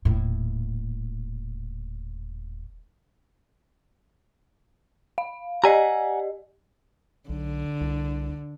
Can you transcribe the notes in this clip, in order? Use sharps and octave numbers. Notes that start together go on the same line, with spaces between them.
D#1 A2
F5
G4 D5 D#5 F#5 G#5 A#5
B1 D3
C2